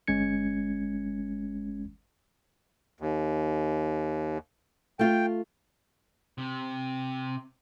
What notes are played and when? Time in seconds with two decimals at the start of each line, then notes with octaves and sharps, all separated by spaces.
0.07 G1 G#3 C#4 G#6 C#7
3.00 D#2
4.99 A3 F4 G5
6.38 C3